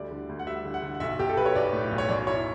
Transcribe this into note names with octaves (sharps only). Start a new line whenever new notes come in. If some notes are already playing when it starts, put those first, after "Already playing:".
Already playing: D2 G3 D5
D3
D2
F#5
G3 E5
D3
F#5
D3
F#5
B1 E5
B1 G4
A4
B1 B4
C#5
B1 D5
A2
B1
C#5
F#2 D5
E4 C#5